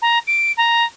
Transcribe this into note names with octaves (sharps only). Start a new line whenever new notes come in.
A#5
D7
A#5